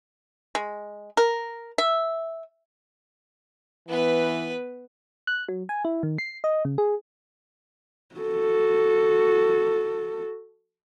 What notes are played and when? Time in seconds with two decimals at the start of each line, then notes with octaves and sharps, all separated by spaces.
0.55 G#3
1.17 A#4
1.78 E5
3.88 E3 B3 B4
5.27 F#6
5.49 F#3
5.69 G#5
5.85 E4
6.03 D#3
6.18 C7
6.44 D#5
6.65 C#3
6.78 G#4
8.15 F#4 A4